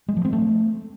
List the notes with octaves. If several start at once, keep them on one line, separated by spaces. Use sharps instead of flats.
G#3
F3
C4
A3